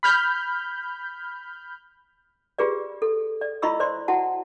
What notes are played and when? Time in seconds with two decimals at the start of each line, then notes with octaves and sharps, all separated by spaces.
0.03 B5 F6 G6
2.59 F4 G4 G#4 B4 D5
3.02 A4
3.41 D5
3.62 E4 F4 D#5 B5 C#6 E6
3.80 C5 D5 C6
4.08 E4 F#4 F#5 A5